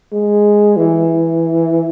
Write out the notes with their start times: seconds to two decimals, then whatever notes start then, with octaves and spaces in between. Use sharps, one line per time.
0.13 G#3
0.77 E3